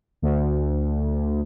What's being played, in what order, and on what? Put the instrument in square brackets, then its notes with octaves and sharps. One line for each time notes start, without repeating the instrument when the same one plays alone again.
[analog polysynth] D2